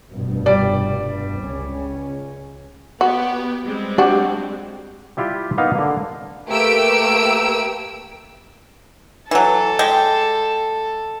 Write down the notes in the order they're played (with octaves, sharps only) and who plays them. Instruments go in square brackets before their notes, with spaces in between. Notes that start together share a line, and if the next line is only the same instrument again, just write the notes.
[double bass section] F1 G2 B2
[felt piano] G3 D5
[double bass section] C#2 C#4
[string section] B3 G4 [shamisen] F#4
[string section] G3 G#3 C4
[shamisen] D4 F#4 [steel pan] G4
[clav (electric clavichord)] G3 E4 F4 G4
A#3 B3 D#4 F5
D3 A#3
[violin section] A3 A#3 G4 B4 E6 D7
[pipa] E3 F#3 [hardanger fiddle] A4
[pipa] G#3 G4